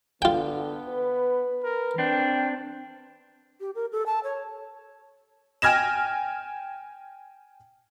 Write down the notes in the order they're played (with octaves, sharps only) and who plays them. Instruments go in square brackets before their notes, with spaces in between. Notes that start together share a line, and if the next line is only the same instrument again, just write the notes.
[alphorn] D3 [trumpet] B3 [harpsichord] F4 G5
[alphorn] B4
[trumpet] A#4
[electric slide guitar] C4 D4 [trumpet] G5
[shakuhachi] G4
A#4
A4
A5
C#5
[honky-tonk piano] G5 G#5 F6 G#6 A#6 E7